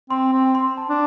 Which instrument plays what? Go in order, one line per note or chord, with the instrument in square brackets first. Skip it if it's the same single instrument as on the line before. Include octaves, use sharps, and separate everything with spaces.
[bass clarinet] C4 [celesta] C6
[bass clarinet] C4
[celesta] C6
A5
[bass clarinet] D4